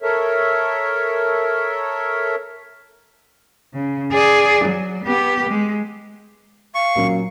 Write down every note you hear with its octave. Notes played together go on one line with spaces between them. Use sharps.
A4 A#4 C#5 E5
C#3
G#4 D5
F#3
B3 G4
G#3
F5 C#6
A#2 F#3 C#4